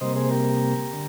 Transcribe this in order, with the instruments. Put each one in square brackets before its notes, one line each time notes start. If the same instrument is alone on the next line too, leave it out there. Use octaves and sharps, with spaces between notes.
[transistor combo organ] C3 G3 A#3 C5 D#5
G#4 C5
G4 A#4
D3